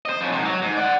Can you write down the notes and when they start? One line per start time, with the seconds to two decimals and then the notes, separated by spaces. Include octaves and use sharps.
0.05 C5 D#5
0.21 F2 C#4
0.32 G#2 C3
0.45 F#3
0.62 G#2
0.77 D5 F#5